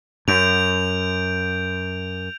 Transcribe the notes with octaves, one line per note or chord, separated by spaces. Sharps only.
F#2 G6 D7 F7